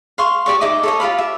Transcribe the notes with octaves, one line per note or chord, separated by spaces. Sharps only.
F5 C6 C#6
G4 D5 C#6
D#4 D#5 E5 D6
A4 C#5 D#5
F4 G4 F5 B5
E5